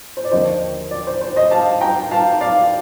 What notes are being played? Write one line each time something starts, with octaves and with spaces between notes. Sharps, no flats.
C5
D5
D#2 D3 F3 C5 D#5
D5
C5
C5
C5 D#5
F5 A5
G5 A#5
F5 A5
D5 F5